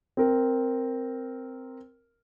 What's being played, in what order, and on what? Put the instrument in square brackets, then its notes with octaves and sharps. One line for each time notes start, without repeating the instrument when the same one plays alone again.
[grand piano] C4 A#4